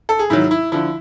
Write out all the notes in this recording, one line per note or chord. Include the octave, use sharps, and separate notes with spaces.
A4
G#4
G#2 D#3 F#3 E4
E4
D3 F3 E4